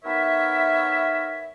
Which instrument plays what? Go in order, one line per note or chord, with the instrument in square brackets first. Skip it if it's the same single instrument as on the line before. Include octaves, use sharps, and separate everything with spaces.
[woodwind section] B3 D#4 A#4 C#5 E5